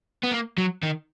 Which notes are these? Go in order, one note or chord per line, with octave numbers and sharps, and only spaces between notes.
B3
A#3
F#3
D#3